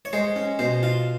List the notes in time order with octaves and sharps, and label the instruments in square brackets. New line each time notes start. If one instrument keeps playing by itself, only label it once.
[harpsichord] C#5
G#3 C5
C#4
B2 C5
F4